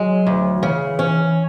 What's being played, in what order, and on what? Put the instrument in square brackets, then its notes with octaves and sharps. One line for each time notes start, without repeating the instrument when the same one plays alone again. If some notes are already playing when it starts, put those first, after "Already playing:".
Already playing: [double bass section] F#3 [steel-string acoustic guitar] G#3
[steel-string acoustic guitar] D2
[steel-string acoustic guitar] C#3 [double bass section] E3
[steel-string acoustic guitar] C#4